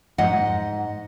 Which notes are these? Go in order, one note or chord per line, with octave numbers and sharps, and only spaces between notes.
G#2 D#5 F#5